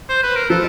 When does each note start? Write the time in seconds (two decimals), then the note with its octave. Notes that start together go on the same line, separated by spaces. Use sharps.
0.10 C5
0.23 B4
0.36 A#4
0.50 F3 A4